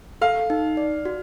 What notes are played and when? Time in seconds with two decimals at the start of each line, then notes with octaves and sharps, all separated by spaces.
0.21 A4 F5
0.50 D#4
0.77 D5
1.05 F#4